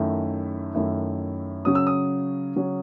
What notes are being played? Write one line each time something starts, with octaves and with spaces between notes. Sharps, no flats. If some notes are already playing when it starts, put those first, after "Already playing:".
Already playing: F#2 D#3 A3 E4
F#2 D#3 A3 E4
C#3 F#3 C#4 D#6
E6
D#6
C#3 F#3 C#4